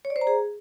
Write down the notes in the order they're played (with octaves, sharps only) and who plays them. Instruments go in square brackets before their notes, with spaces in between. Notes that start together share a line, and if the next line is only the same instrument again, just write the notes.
[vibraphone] C#5
D5
C5
A#5
G#4